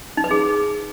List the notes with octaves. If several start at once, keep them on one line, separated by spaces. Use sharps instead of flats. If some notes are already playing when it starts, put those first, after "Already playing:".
D#4
B4
G#4